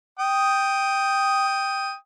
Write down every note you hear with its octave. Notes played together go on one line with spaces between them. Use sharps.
G5 D#6